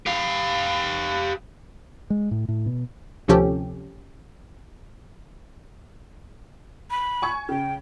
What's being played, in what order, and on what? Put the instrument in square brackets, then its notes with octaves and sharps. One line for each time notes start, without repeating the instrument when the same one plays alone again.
[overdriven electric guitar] G4 F5
[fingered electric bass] G#3
A2
A2
B2
[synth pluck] D2 C3 F3 C#4 G4 A4
[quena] B5
[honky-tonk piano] G#5 C#6 G#6
[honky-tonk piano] C#3 [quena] G5